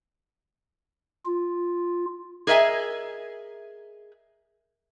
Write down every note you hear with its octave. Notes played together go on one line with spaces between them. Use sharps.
F4
G#4 A#4 D#5 E5 G#5